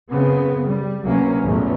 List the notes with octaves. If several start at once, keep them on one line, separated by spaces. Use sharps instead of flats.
F#2 C#3 B3 C4
G3
D2 C3 F#3 A#3 B3 C#4
A1 E2 B2 F3 F#3 A3